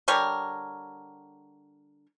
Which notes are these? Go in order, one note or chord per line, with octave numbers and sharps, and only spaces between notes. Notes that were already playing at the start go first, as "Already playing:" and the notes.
D3 G3 A#4 C#5